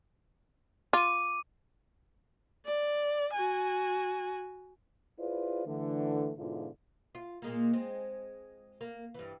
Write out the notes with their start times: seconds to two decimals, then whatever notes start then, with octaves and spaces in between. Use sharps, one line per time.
0.93 F4 D6 D#7
2.66 D5
3.33 F#4 G#5
5.19 E4 F4 G#4 B4 C5 D5
5.67 D3 E3 A3
6.38 G#2 B2 D3 E4 F4
7.15 F4
7.42 A#2 G#3 A#3
7.73 G#3 C4
8.81 A#3
9.14 G2 E3